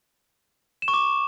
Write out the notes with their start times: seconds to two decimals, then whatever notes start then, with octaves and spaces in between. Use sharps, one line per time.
0.82 E7
0.88 C#6
0.94 D6